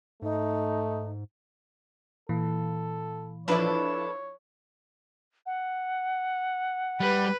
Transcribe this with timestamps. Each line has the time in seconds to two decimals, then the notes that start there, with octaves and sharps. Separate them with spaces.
0.22 G#2 A3 D#4
2.29 A#2 E3 A4
3.48 F3 D4 E4 A4 B4 C#5
5.46 F#5
7.00 G3 B4